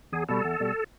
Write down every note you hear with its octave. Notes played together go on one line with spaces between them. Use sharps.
E2 G#4
B2 G3 A4
E2
B2 G3